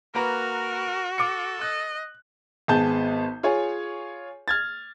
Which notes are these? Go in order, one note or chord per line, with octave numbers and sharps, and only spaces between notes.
A#3 F#4 A#4 B4 A#5
A4 D6 C#7
D#5 F#6
G#1 B3 G#4 A5 G6
F4 G#4 C#5 G#5
F6 G#6 A6